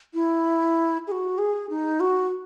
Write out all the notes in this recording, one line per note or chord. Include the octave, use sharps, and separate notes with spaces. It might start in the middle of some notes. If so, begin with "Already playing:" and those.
E4
G#4
F#4
G#4
D#4
F#4